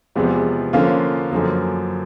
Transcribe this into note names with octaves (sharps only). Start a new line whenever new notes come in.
E2 C3 F3 G#3 B3
D3 F3 A#3 C#4 F4
F#2 D3 F3 A#3